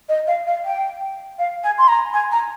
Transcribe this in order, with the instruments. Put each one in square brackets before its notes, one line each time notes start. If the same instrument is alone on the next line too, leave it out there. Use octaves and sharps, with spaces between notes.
[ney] D#5
F5
F5
G5
F5
G#5
C6
A#5
G#5
A#5